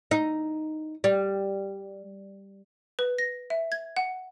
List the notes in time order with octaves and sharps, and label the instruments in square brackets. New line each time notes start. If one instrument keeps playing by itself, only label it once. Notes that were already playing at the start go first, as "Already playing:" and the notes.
[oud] D#4
G3
[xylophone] B4
A#6
E5
G#6
F#5